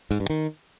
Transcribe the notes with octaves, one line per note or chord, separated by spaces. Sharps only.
G#2
G2
D#3